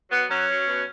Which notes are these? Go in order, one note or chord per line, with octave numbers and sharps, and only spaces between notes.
F#3 B3
F#3 C#4
F#3
B2